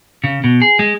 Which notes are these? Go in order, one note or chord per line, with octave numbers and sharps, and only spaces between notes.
C#3
B2
G#4
G#3